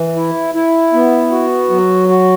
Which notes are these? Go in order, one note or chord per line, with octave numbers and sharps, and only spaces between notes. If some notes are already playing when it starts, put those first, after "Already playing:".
Already playing: E3
E4
E4
B3
F#4
F#3
F#4